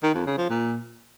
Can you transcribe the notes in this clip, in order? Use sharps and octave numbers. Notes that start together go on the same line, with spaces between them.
D#3
F2
C#3
F3
A#2